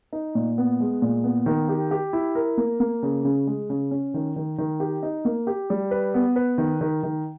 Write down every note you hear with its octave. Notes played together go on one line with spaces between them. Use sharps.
D#4
A#2
B3
G#3
A#2
B3
D#3
G4
G4
E4
A#4
A#3
A#3
C#3
C#3
G#3
C#3
C#4
D#3
D#3
D#3
G4
D#4
A#3
G4
G3
B4
B3
B4
D#3
D#3
D#3